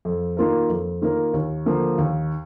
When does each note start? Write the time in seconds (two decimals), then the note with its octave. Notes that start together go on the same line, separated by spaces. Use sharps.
0.05 F2
0.37 D#3 A#3 F4 A#4
0.69 F2
1.02 D#3 A#3 F4 A#4
1.34 D#2
1.66 D3 F3 A#3
1.98 D#2